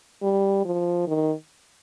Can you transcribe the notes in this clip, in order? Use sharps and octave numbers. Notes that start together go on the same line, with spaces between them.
G3
F3
D#3